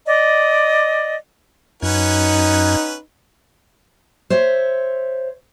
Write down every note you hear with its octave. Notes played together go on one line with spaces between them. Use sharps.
D5 D#5
F#2 C#4 D#4 B4 F#5 G#6
C5 C#5 E5